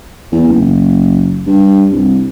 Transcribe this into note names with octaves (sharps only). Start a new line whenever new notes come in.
E2
F#1
G2
C2